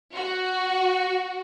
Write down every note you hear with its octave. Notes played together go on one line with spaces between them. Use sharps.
F#4